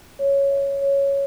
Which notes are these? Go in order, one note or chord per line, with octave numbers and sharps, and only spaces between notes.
C#5
E5
C#5